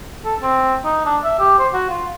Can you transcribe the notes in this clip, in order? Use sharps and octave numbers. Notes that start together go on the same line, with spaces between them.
A4
C4
D#4
D4
E5
G4
C5
F#4
F4